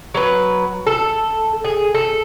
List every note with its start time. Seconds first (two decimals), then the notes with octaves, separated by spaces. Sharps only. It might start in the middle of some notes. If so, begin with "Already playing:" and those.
0.14 F#3 B4
0.87 A4
1.65 G#4
1.95 A4